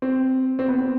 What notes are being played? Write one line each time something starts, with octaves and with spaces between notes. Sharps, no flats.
C4
C4
B3
C4